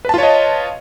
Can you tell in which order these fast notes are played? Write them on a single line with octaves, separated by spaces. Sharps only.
B4 A5 F4 C#5 D#5